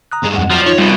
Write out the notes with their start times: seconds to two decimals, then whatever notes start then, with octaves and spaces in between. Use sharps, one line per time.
0.12 A#5 D#6 F#6
0.23 G2 G#3
0.36 F2 F#5
0.50 F3 F#3 G5
0.66 D#4 F4 C#5
0.78 F2 B2 G3 C4